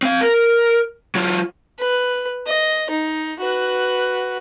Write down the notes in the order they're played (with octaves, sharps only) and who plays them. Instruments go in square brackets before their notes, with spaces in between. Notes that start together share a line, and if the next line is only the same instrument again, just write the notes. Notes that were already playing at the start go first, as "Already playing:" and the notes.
[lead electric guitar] C4 F5
A#4
F#3 F4
[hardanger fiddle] B4
D#5
D#4
F#4 B4